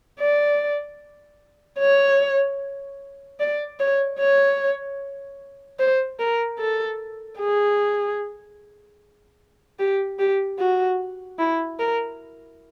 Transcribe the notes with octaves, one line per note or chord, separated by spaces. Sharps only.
D5
C#5
D5
C#5
C#5
C5
A#4
A4
G#4
G4
G4
F#4
E4
A#4